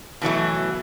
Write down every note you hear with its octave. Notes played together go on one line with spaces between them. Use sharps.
B2 E3 F#3 A3